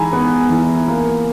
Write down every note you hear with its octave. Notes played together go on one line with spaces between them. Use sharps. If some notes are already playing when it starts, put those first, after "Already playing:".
Already playing: E3 G#3 G#5 A#5 B5
B3
E3
A#3